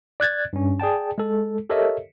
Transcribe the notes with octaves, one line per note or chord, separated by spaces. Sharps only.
D5 F#6 G#6 A6
G2 C#4
G#4 D5 G5 A5
G#3 A4
G4 A4 A#4 C#5 D#5 E5